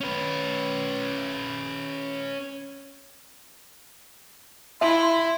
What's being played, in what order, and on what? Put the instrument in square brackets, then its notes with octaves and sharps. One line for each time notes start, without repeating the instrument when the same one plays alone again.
[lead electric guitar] C#4 B4
[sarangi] E4 [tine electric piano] E5 [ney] C6